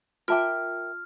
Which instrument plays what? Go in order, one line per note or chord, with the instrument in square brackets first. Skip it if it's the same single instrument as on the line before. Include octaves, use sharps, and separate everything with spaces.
[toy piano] F4 A5 D6 [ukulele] A#4 E5 G5 [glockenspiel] F6